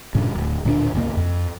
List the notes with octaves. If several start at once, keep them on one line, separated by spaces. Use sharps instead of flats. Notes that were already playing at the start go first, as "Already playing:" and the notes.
G2 A#2 C#3
D1
D1 A#2 C4 D4
F#1 C2 D#3 A#3
F2